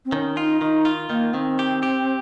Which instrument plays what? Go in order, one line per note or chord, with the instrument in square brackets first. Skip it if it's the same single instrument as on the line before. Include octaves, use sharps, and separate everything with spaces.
[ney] C4
[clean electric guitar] D#3 [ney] C#4
[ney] D#4 [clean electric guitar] F4
[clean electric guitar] D#3 [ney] D#4
[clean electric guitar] F4
[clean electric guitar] D#3 [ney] A#3
[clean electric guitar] D#3 [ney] C4
[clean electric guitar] G4
G4